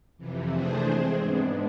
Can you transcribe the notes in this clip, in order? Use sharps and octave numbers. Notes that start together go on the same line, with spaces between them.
F2 C3 E3
E3 A3 D4 G#4 C5
G#3 C4 G#4 C5
G#2 G#3 B3 D4